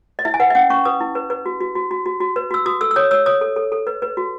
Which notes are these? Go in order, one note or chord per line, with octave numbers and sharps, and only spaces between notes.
D#5
E4 E5
G#5
B4 F#5
E5
C#4 F#5
C#4 C#6
B4 D#6
E4
B4
B4
F#4
F#4
F#4
F#4
F#4
F#4
B4
F#4 E6
F#4 D#6
A4 E6
E6
C#5 D#6
C#5 E6
C#5 D#6
A4
A4
A4
B4
B4
F#4